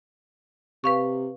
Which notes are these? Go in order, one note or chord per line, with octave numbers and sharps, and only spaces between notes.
C3 B4 F5 C#6